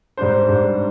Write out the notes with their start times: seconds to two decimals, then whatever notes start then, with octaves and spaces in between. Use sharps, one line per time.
0.17 G#2 G3 D4 C5
0.49 G#2 G3 D4